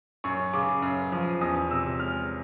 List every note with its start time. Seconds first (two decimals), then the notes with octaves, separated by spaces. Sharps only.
0.24 F#2 C#6
0.53 C#3 D6
0.82 F#2
1.12 F3
1.41 E2 D#6
1.71 C3 E6
2.00 G#3 F6